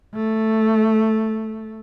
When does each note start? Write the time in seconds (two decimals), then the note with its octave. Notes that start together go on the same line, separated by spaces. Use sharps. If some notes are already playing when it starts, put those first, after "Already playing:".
0.15 A3